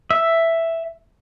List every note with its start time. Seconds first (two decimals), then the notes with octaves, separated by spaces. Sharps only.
0.11 E5